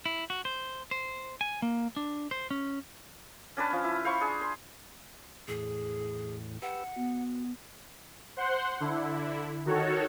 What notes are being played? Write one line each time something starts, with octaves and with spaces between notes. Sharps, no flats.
E4
F#4
C5
C5
G#5
A#3
D4
C5
C#4
C#4 D4 B4 A5
F3 C#4
E4
C5 F5 B5 C#6
D4 G#4
C6
E2 A2 G#4
G4 B4 F#5 E6
B3 F#4
C5 F#5 C6
D3 E4
D#3 F#4 A4 C#5